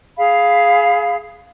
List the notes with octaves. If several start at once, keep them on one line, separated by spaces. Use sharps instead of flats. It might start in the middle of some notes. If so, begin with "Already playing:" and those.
G#4 F5 B5